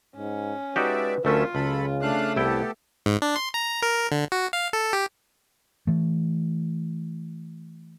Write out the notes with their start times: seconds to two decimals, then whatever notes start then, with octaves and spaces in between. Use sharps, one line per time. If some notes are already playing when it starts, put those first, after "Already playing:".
0.16 G#2 C#4
0.76 G#3 D#4 F#4 G4 B4 D5 E5
1.25 D2 F#3 A3 C#4 F4 A#4 E5
1.55 C#2 C#3 F#3 A4 B5
2.02 A3 D4 F5 F#6
2.36 C2 B3 E4 G4 A4 G5
3.06 G#2
3.22 D4
3.36 C6
3.54 A#5
3.82 A#4
4.12 D3
4.32 F#4
4.53 F5
4.73 A4
4.93 G4
5.87 E3 A3